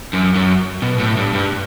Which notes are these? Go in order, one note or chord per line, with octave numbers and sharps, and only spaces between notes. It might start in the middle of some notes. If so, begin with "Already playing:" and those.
F#2
F#2
B2
A2
G2
G2